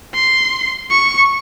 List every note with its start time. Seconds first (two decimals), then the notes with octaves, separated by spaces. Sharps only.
0.15 C6
0.90 C#6